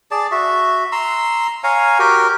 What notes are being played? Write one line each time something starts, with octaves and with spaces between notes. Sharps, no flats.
G#4 D5 A5
F#4 E5
A#5 C6 E6
C#5 F5 G#5 A#5
F#4 G4 A#4